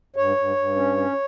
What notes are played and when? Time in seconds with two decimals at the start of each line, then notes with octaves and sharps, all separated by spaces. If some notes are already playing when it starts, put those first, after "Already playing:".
0.16 G2 C#5
0.36 G2
0.56 G2
0.76 C#4
0.97 C#4